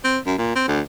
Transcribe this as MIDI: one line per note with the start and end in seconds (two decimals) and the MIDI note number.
0.05 0.18 60
0.26 0.35 42
0.38 0.52 46
0.56 0.65 60
0.68 0.81 38